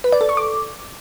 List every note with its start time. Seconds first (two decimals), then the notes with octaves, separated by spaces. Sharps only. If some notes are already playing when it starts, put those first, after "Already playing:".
0.04 B4
0.12 D5
0.21 A4
0.29 C#6
0.37 D6